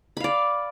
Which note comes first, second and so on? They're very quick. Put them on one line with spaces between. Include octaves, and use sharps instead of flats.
B5 F5 D5